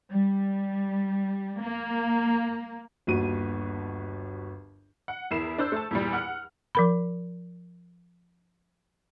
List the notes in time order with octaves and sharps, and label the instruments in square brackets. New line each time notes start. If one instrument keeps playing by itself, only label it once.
[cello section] G3
A#3
[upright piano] G1 D#2 F#4 D#7
[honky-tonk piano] F#5
E2 E4 A#4 C7 E7
D4 C5 E6 G6
A3 A5
E2 A#2 G3
F#5 F6
[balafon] F3 A#4 B5